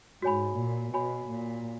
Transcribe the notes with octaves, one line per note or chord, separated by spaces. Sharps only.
G#2 F#4 C#5 G#5 B5
A#2
B2 F#4 C#5 G#5 B5
A#2